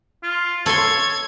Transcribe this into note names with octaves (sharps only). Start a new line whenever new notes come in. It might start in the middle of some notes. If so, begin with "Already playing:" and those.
F4
A4 C#5 C6 G#6